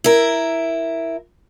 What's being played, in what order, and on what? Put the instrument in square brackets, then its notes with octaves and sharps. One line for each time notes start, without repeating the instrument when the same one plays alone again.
[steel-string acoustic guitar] E4 A#4